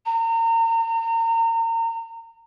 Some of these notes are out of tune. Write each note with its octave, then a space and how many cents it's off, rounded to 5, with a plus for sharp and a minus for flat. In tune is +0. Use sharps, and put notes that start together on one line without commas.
A#5 -35